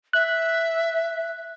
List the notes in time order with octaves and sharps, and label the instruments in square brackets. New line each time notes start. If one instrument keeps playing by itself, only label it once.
[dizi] E5 [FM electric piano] F#6